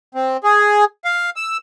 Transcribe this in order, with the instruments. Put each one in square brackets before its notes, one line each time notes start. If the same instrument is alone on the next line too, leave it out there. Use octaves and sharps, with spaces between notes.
[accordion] C4
G#4
F5
E6